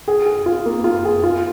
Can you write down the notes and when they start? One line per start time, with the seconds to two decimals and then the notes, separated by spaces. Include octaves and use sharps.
0.08 G#4
0.26 G#4
0.46 F4
0.66 A#3
0.84 F4
1.05 G#4
1.23 F4